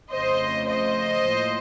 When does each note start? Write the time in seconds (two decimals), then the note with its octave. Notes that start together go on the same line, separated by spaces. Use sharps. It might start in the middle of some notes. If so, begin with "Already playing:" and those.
0.11 F2 C#3 A3 C5 D#5
0.68 C5 D#5
1.25 A2 F3 A#3